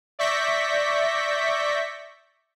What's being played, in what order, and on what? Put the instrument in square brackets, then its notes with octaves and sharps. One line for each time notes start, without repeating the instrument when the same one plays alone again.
[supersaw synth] D5 E5 C#6 G6 A#6 B6